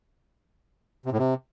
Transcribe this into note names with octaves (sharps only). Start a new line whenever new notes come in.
C3
A2
C3